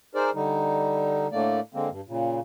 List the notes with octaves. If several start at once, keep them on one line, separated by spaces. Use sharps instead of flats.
D#4 G#4 A#4 C5 D5
D3 G3 D#4
A2 D3 A3 A#3 D5
D3 G#3 A#3 C4
G2
A#2 C#3